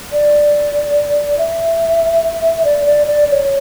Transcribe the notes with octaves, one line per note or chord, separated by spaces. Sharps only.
D5
E5
D5
D5
D5
D5
C#5